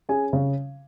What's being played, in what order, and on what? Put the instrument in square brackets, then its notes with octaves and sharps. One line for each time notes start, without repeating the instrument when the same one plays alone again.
[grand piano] C#4 G#4 G#5
C#3